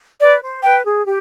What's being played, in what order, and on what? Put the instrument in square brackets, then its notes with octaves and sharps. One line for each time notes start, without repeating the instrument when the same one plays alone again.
[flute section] B4 [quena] D5
[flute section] C5
[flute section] B4 [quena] G5
[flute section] G#4
G4